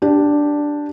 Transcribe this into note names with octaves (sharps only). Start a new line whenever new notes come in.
D4 G4